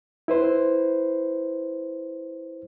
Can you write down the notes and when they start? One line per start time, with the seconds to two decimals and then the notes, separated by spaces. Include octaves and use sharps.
0.28 E4 B4 C5